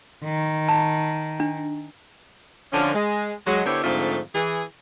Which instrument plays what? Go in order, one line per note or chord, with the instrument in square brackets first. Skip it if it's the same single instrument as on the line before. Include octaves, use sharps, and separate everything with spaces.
[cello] D#3
[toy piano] A5
D4
[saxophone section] D3 F3 C#4
G#3
F#3 G#3
D3 B3 E4 G4 C5 C#5
G#2 D3 F3 A3 C4 F4
E3 G#4